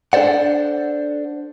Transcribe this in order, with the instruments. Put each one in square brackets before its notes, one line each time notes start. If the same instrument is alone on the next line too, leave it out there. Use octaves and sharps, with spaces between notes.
[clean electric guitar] D4 A4 C5 D5 F#5